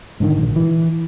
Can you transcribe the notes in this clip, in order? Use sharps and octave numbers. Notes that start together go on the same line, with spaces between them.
G#2 D3 D#3
A#1
E3